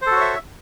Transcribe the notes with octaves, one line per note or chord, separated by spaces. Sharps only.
F#4 A4 C5 C#5 E5